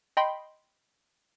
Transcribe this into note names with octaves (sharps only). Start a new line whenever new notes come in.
D#5 G5 B5 C6